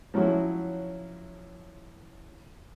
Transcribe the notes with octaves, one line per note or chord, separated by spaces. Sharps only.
F3 F#3 C#4 E4 F#4